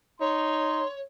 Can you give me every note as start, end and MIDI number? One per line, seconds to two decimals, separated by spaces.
0.20 0.84 63
0.20 1.00 73
0.20 0.85 84